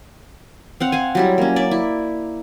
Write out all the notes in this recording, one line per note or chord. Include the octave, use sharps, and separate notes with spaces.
C4 F5 F#5
F5 F#5 G#5
F#3 G3 E4
A#3 C#4
D5 E5
E4